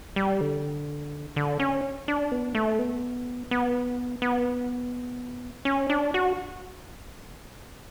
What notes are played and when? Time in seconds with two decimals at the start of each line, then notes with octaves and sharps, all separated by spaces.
0.16 G3
0.41 D3
1.36 D3
1.60 C#4
2.08 D4
2.32 B3
2.55 A3
2.79 B3
3.51 B3
4.22 B3
5.65 C#4
5.90 D4
6.14 F#4